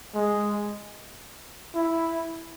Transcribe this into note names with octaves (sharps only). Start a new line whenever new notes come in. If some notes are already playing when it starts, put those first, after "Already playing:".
G#3
E4